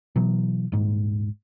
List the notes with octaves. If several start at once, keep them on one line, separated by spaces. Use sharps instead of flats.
B2 E3 F#3
D#1 D#2 G#2